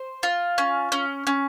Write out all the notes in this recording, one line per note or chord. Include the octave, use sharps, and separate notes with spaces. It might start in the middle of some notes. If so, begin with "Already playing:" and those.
Already playing: C5
F4
C#4
C#4
C#4